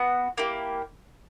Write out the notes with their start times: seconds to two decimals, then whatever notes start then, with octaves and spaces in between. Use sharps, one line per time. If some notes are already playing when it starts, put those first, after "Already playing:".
Already playing: B3 F#4
0.38 A#3 E4 G4